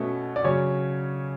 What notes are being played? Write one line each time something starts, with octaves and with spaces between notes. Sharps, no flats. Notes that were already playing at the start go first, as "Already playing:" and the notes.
Already playing: B2 A3 C#4
D5
C#3 F#3 C#4 C#5